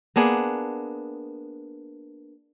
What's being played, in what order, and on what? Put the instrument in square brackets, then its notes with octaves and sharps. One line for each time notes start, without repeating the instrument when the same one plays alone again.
[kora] A#3 B3 D4 G#4